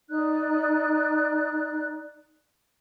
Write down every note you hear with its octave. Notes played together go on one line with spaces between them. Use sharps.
D#4 D5 F#6